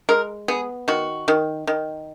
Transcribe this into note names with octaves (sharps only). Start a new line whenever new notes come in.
G#3 A#4
B3 G#4
D#3 F#4
D#3
D#3